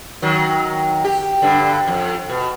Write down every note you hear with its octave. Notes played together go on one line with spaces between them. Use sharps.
D#3 F#3
G4
G2 D3
F2
B2